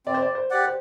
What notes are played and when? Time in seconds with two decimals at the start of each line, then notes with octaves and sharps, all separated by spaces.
0.06 C4 D5
0.14 C5
0.22 D5
0.35 C5
0.50 G4 D5 F#5
0.65 C5